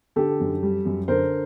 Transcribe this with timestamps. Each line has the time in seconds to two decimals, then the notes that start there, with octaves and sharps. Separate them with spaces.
0.16 D3 G4 A4
0.40 F#2
0.63 G3
0.85 F#2
1.08 D3 A#4 C5